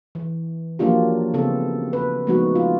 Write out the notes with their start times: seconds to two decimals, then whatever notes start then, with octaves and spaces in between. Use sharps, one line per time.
0.15 E3
0.79 F3 F#3 A#3 D4 F4 G4
1.34 C#3 B3 C4 A4
1.93 B4
2.27 F3 G#3 A3 B3 D#4 F#4
2.56 F4